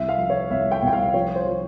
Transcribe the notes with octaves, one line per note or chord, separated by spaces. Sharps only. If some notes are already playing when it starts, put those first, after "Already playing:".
Already playing: C2 E5
F5
F3
C#5
C2 E5
G5
C2 G5
F5
F3 C#5
C5
F3